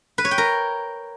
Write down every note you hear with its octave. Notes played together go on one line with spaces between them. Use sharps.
B4
C#5
G5
A#4